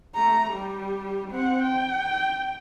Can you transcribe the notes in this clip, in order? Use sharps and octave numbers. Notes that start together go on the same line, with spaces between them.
A3 A#5
G3 G4
C4 F#5
G5